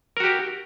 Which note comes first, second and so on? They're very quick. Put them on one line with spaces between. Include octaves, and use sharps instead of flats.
A#4 F#4 G4